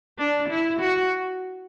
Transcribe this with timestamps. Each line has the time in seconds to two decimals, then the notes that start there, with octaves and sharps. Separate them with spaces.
0.19 D4
0.49 E4
0.80 F#4